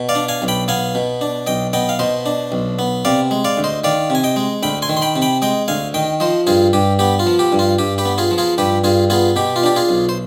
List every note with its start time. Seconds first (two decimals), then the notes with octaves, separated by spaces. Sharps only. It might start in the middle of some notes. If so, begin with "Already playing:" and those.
Already playing: B2
0.09 D5 F5
0.15 D4
0.29 F5 G#5
0.42 B1
0.48 G5 B5
0.68 B3 F5 G#5
0.95 B2
1.21 D4
1.47 B1 D#5 G5
1.73 B3 D#5 G5
1.89 F5
1.99 B2 C5 D#5
2.26 D4
2.52 B1
2.79 B3
3.05 C3 D5 F5
3.31 G#3
3.44 D5 F5
3.57 D2
3.64 C5 D#5
3.84 D#3 D5 F5
4.10 C3 G#5
4.24 D#5 G5
4.36 G#3
4.63 D2 G5 B5
4.82 G#5 C6
4.89 D#3
4.97 C6
5.02 G5 B5
5.16 C3
5.22 G5 B5
5.42 G#3 D#5 G5
5.68 D2 F5 G#5
5.94 D#3 D#5 G5
6.20 F3 C5 D#5
6.47 G2 F4 G#4
6.73 G2 G4
6.99 B3 G4
7.19 F4
7.26 F3
7.39 G4
7.52 G2
7.59 F4
7.78 G2 G4
7.98 G4 B4
8.05 B3
8.18 F4 G#4
8.31 F3
8.38 F4 G#4
8.58 G2 G4 B4
8.84 G2 F4 G#4
9.10 B3 F4 G#4
9.36 B2 G4
9.56 F4
9.63 D4 G4
9.76 F4 G#4
9.89 B1
10.09 C5